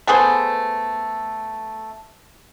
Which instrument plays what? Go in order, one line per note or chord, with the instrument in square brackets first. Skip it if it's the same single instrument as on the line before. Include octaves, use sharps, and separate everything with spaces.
[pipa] A3 B3 G#4 C5